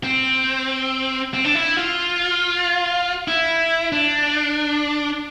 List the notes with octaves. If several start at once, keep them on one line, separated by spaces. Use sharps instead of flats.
C4
C4
D4
E4
F4
E4
D4